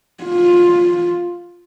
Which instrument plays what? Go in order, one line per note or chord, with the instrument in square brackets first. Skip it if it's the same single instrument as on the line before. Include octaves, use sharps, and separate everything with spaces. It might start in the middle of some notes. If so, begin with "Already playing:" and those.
[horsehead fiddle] F4